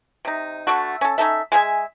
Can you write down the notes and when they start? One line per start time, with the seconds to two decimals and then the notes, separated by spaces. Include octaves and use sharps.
0.25 C3 D#4
0.67 D3 A3 D4 F#4
1.01 C#4 A4
1.18 C#4 D#4 A4 E5
1.52 G#3 G#4 E5 G#5